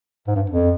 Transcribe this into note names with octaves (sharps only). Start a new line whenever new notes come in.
G#2
G2
F2